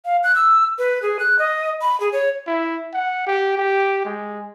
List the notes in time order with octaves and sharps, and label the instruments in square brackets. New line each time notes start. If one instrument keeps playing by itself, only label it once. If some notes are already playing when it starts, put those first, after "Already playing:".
[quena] F5
F#6
E6
B4
G#4
F#6
D#5
B5
G#4
C#5
[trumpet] E4
F#5
G4
G4
G#3